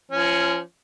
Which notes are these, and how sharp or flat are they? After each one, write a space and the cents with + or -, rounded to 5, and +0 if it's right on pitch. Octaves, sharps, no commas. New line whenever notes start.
F3 -30 C#4 +0